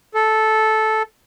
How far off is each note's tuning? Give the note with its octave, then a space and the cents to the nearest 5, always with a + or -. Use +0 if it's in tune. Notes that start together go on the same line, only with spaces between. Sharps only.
A4 -10